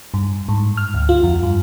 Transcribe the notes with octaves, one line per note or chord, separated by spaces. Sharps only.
G2
G#2
F6
D2
F4
F2
G2